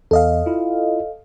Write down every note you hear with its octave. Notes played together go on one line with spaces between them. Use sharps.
E2 A4 D#5 F5
E4 F4